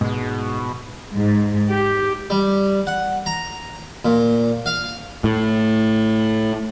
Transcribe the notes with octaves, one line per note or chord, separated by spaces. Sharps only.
G#2 B2 G#3
G#2
G4
G3
F#5
A#5
A#2
F5
A2